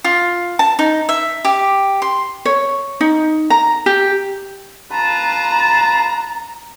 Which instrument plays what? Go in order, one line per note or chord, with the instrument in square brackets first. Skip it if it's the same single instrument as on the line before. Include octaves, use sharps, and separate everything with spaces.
[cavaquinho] F4
A5
D#4
E5
G4
C6
[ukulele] C#5
D#4
A#5
G4
[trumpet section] F4 B4 A5 [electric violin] A#5